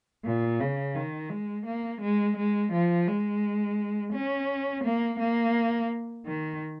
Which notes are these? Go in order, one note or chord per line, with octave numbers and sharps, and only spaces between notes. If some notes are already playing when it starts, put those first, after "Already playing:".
A#2
C#3
D#3
G#3
A#3
G#3
G#3
F3
G#3
C#4
A#3
A#3
D#3